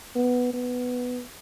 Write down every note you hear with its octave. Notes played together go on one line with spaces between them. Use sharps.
B3
B3